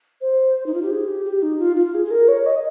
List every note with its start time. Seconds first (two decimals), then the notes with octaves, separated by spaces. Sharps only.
0.21 C5
0.66 D#4
0.74 F4
0.83 G4
0.91 G#4
1.08 G4
1.26 G4
1.42 D#4
1.59 F4
1.76 F4
1.95 G#4
2.05 G#4
2.11 A#4
2.28 C#5
2.46 D#5